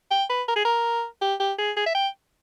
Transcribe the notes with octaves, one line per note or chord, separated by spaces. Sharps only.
G5
B4
A#4
G#4
A#4
G4
G4
G#4
G#4
E5
G5